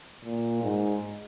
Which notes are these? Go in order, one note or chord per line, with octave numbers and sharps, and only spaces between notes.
A#2
G#2